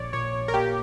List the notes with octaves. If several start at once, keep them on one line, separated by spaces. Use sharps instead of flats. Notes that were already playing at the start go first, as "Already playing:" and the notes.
Already playing: A#1 C#5 D5
A#2 C#5
C#5
A#4
A#3 G4